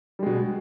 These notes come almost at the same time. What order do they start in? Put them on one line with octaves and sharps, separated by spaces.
G3 G#3 B2